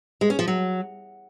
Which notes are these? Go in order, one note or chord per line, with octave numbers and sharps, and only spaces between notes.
G#3
C#4
F3
F#3